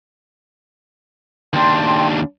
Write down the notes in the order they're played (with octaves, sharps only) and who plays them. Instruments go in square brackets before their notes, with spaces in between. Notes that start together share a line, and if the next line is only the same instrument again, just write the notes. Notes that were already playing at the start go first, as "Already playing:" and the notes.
[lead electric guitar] D#2 D4 [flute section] G5 C6